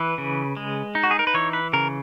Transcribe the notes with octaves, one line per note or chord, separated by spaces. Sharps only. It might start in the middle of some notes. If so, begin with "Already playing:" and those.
Already playing: E3 B4
C#3
G#3
D#4
F#4
G#4
A#4
B4
E3 C#5
B4
C#3 A#4